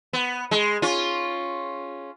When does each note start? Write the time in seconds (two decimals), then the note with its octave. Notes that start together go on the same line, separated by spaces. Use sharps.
0.13 B3
0.51 G#3
0.82 C#4 F4